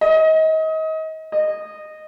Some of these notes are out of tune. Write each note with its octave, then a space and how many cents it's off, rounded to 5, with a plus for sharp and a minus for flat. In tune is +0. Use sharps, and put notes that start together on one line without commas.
D#5 +30
D#5 -15